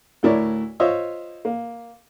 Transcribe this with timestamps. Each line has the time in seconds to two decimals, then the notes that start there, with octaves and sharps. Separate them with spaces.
0.23 D2 A2 E4 A#4 C#5 D5
0.80 F4 C5 C#5 D#5 E5
1.45 A#3